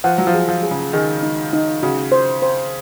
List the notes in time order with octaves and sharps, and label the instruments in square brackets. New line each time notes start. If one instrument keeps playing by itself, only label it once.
[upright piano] F3 [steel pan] F#5
[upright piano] F#3
F3
[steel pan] G#4
[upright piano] F3
[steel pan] G#4
[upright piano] C#3
[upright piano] D#3 [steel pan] G#4
[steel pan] D#4
D#4
[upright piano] C#3 [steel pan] F#4
[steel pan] C5
C5